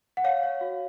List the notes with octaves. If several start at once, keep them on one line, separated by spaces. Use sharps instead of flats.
F#5
C#5 F5
C#5
F#4